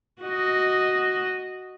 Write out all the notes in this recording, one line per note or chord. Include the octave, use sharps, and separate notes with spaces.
F#4 D#5